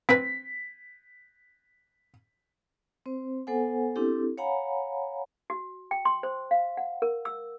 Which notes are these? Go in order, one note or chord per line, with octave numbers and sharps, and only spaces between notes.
C4 B4 B6
C4 C5
B3 A4 C5 F#5 G#5
C4 D4 E4 G4 A4
C#5 F5 F#5 G#5 A#5 B5
F#4
G5
C6
C5
F5
F#5
A#4
E6